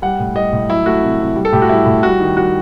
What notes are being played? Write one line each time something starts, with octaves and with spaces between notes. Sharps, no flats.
G3 F#5
A2
G3 D#5
A2
F#3 E4
A3 F#4
C3
C3
G3
A4
A2 G4
F#4
G3 E4
A2
G3 F#4
D#3
G3 F#4